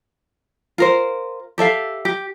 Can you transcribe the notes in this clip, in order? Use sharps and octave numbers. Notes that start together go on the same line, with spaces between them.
F4 A#4 C5
G4 A4 E5 F5
G4